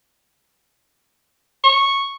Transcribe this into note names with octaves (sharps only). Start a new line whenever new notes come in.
C#6